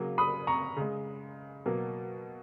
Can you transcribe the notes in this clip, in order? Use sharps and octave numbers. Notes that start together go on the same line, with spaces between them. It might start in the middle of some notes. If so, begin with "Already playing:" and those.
Already playing: C#3 F#3 A#3
B5 D#6
A#5 C#6
C#3 G#3
B2 F#3 A#3